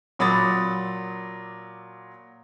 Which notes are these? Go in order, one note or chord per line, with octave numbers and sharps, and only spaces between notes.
A#2 F#3 B5 D6 D#6 A6